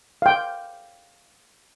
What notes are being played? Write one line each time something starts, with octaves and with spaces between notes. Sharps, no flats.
F5 G5